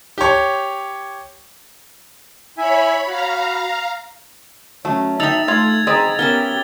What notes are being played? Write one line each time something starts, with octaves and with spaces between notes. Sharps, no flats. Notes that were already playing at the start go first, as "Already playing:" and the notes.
G4 C#5
E4 C#5 E5 G#5 B5
F#4 F5 A#5 B5
F#3 A3 C#4
D#4 E5 G5 E6 A6 F7
A3 F4 G#6 F7
C4 G#4 B4 D#5 A#5 A6
B3 C#4 G4 A#4 E5 G7